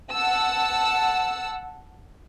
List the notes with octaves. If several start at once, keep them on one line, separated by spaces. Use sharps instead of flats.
F#5 A5 E6